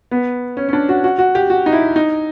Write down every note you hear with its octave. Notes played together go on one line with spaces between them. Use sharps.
B3
C#4
C#4
D4
F#4
F#4
F#4
G4
F#4
D#4
E4
D#4